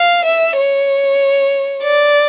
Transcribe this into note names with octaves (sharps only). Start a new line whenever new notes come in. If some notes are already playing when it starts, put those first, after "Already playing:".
Already playing: F5
E5
C#5
D5